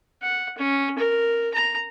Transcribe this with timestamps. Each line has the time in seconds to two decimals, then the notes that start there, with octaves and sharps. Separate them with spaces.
0.22 F#5
0.58 C#4
0.98 A#4
1.54 A#5